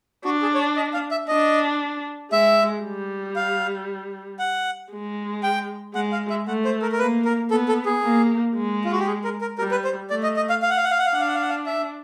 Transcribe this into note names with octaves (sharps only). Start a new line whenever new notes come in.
D4 F#4
G#4
C#5
D5
D#5
F5
E5
D4 D#5
G#3 E5
G3
F5
F#5
G#3
G5
G#3 F#5
F5
E5
A3 F#5
C5
A#4
A#4
A#3 B4
A#4
B3 A4
A4
G#4
A#3
G#3
F4
F#4
G4
G#4
A#4
A#4
G3 A#4
B4
C5
A3 D5
D#5
D#5
F5
F5
F#5
F5
F#5
F5
F#5
F5
D4 F#5
F5
F#5
F5
F#5
F5
E5